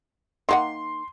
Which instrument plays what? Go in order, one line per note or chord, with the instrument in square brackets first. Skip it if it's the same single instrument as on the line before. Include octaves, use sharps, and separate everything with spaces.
[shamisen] D#3 A#3 F#5 [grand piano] C6